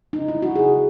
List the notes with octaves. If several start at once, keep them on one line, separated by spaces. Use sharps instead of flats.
C#3 D#4
E4
G#3
F#4
C#3 G#4